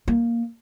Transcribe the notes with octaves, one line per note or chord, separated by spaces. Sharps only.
A#3